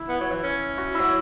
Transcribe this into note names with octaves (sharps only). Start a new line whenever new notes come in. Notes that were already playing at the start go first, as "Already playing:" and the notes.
Already playing: E4
B3
F#3
E3
C#4
F#4
E4
F#3